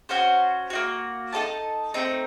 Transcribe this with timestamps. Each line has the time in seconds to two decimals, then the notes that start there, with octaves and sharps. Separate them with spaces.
0.09 C#4 F#4 C5 F#5
0.70 A#3 D#4 F#4
1.33 D#4 A4 D#5 A5
1.94 A3 C4 D#4